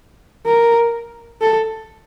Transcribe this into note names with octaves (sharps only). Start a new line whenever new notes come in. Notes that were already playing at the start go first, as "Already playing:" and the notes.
A#4
A4